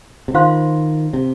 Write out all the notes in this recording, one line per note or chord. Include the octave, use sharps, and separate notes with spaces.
C3
D#3 F4 C5 F5 C6
C3